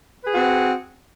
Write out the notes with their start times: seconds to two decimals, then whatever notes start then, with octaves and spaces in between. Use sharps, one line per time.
0.23 B4
0.27 G#4
0.32 F#4
0.36 C4